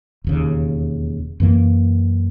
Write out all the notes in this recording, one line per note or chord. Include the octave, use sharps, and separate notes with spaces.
E1 D#2 C#3
F#2 E3 A#3